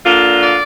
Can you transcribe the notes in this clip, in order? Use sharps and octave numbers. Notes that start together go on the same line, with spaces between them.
D3 A#3 D4 F4
D5